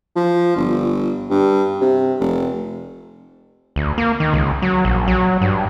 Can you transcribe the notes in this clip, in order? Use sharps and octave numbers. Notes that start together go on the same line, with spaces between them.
F3
G1
G2
C3
F1
D2
A#3
D#3
C#2
F#3
A#1
F#3
G2